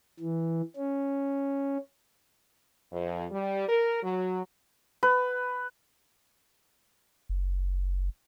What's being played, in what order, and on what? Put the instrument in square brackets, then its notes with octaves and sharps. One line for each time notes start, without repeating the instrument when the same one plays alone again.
[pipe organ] E3
C#4
[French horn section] F2
G3
A#4
F#3
[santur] B4
[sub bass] F#1